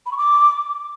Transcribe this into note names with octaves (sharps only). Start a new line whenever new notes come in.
B5
C#6
D6